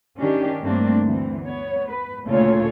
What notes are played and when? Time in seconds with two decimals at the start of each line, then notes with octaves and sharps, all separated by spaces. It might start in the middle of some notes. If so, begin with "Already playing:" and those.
0.19 D#3 C#4 D4 G4
0.62 G2 A3 A#3 C4 D4
1.03 D2 E3 C4
1.43 B3 C#5
1.89 B4
2.27 D2 A#2 C#3 F4 A4 C#5